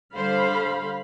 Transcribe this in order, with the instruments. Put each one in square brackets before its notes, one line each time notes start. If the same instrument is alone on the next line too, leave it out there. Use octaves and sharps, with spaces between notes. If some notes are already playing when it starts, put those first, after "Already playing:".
[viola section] D3 F5 B5 [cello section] G3 C5